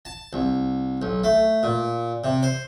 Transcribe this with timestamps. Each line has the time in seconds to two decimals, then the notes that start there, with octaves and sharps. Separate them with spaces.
0.05 A5
0.33 C2
1.02 B1
1.24 A3
1.63 A#2
2.24 C3
2.43 C5